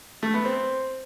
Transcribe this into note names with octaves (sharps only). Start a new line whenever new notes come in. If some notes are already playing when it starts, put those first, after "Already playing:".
A3
B3
C4